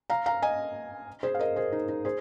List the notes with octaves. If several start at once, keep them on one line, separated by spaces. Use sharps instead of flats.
F5 A#5
F5 A#5
D#5 G#5
G#4 C5
F5
A#4 D#5
G#4 C5
D#4
D#4
G#4 C5